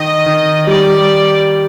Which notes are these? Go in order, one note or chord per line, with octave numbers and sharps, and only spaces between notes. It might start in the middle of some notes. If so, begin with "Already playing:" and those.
Already playing: D#3 D#5
D#3
G3 D5